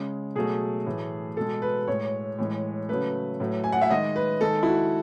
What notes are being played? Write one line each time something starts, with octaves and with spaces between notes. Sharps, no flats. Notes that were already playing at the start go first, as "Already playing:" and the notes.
Already playing: C#3 G#3
B2 F#3 A3 G#4
A2 E3 A3
B2 G#3 A4
B4
A2 G#3 C#5
A2 E3 G#3
C#3 F#3 A3 B4
A2 F#3 A3
G#5
F#5
E5
D#3 G#3 D#5
B4
D#3 G#3 A4
E4
F#4